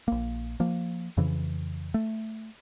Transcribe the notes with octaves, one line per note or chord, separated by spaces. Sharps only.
A#1 A#3
F3 A#3
F2 C#3 E3
A3